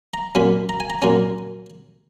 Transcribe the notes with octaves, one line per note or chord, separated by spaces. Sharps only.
A#5
A#2 F#3 C#4 B5
A#5
G#5
A#5
A#2 F#3 C#4 A#5